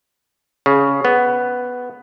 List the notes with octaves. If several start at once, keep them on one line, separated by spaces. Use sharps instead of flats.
C#3
B3